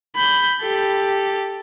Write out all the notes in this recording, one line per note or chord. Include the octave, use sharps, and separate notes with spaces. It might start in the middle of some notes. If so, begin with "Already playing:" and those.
B5 G6
G4 A4